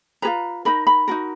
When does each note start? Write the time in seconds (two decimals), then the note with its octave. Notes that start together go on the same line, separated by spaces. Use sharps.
0.22 F4 G#4 B4 A#5
0.65 D#4 A#4 B5
0.87 B5
1.08 D#4 F#4 A#4